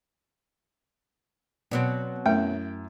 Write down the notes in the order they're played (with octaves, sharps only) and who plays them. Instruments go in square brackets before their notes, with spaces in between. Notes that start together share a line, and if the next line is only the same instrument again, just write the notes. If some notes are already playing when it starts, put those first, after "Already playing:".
[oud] B2 F#3 C4 [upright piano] B3 D5
[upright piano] F#2 E4 [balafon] A3 [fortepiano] G5